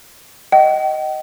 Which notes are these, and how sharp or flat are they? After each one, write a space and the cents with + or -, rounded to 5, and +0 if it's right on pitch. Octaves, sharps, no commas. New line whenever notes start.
D#5 +0 G5 -45